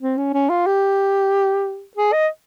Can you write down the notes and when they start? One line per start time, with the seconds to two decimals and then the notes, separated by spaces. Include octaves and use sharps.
0.01 C4
0.17 C#4
0.34 C#4
0.50 F4
0.66 G4
1.97 G#4
2.13 D#5